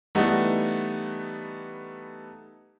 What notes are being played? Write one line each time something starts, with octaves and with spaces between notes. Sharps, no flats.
E3 G3 A3 B3 D#4